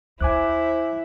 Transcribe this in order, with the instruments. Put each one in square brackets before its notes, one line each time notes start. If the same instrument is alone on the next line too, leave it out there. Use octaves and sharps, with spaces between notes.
[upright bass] D#2 [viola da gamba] E4 [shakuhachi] C5 [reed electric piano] G#5 D6 F#6